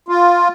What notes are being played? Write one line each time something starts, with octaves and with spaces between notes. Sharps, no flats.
F4